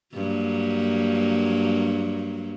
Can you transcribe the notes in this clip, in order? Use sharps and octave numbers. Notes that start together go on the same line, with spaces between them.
G2 F#3 A#3